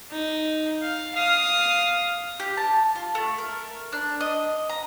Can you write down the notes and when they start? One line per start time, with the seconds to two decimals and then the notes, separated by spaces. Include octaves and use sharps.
0.11 D#4
0.82 F5
1.15 F5 D#6
2.40 G4
2.57 A5
2.96 F4
3.15 A3
3.38 A#4
3.92 D4
4.21 D#5
4.69 A#5